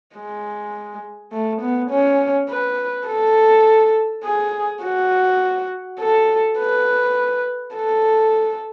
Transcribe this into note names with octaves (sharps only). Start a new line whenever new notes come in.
G#3
A3
B3
C#4
B4
A4
G#4
F#4
A4
B4
A4